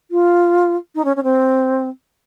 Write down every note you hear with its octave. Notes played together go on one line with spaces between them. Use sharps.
F4
D#4
C#4
C#4
C4